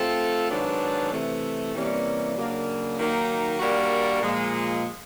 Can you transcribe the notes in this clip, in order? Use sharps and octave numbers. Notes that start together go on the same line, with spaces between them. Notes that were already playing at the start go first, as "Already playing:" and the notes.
Already playing: A3 C4 F4 A4
G#2 D#3 F#3 B3 D4
C3 E3 A3
C3 E3 G3 A#3 C#4
C#3 F#3 A#3 D4
D#3 F#3 A#3 D#4
G3 A#3 D4 F#4 A#4
A#2 F3 G#3